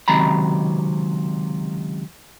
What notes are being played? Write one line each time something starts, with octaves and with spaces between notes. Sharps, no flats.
C#2 C3 D#3 F#3 A#5 B5